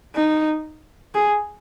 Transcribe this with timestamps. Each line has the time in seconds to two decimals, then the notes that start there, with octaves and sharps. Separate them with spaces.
0.15 D#4
1.14 G#4